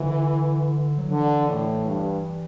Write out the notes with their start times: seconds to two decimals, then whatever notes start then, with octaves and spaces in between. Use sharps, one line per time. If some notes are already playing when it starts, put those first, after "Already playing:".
Already playing: D3 E3
0.98 F#3
1.10 D3 E3
1.48 A2
1.86 G2